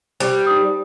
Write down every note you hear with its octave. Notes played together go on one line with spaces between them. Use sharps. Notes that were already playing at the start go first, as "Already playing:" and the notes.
G3 G4 C5
D#4 D#6